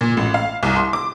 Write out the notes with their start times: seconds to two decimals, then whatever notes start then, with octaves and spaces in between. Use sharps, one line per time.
0.01 A#2
0.17 A1
0.34 F5
0.63 C2
0.76 C6
0.93 D6